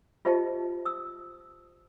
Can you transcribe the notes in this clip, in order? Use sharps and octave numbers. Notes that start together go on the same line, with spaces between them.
F4 G4 C5 D#5 E5 A5
D#6 E6